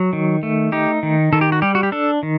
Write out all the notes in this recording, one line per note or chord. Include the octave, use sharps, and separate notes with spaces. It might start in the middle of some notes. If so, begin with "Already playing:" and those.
Already playing: F#3
D#3
A3
D#4 G4
D#3
D#3 A4
G4
F#4
G3 G4
F#4
G4
D4 A4
D#3